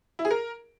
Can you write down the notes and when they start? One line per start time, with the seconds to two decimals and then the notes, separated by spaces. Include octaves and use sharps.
0.19 E4
0.25 G#4
0.31 A#4